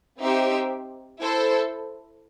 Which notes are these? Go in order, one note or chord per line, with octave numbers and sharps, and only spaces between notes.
C4 D#4 G4 C5 E5
E4 A4 C5